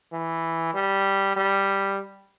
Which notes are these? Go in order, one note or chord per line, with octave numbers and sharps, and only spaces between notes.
E3
G3
G3